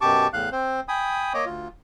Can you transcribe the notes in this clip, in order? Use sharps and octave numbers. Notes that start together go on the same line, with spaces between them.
F#2 B2 G4 A5 C#6 D6
E2 A2 F5 F#6
C4 C5
G5 G#5 B5 D#6
A#3 C#5 D#5 D6
D2 F4